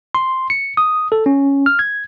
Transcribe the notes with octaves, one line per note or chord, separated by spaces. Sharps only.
C6
C#7
D#6
A4
C#4
F6
G#6